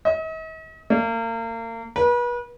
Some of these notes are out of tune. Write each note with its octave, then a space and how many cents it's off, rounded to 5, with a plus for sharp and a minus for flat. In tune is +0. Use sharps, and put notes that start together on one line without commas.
D#5 +45
A#3 -35
B4 -35